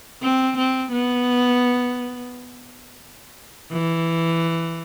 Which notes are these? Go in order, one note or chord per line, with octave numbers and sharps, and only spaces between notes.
C4
C4
B3
E3